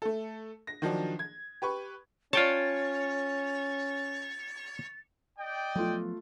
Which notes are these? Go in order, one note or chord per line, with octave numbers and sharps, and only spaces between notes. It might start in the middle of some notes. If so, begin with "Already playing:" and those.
A3 A4
A#6
D#3 F3 F#3 D4
G#6
G4 B4 C#6
C#4 F4 C#5 G5 A5 A6
D5 D#5 G5
F3 F#3 A3 B3 F4